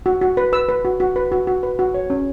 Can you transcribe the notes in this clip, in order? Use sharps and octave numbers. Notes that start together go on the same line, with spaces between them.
F#4
F#4
B4
B4 E6
B4
F#4
F#4
B4
F#4
F#4
B4
F#4
C#5
C#4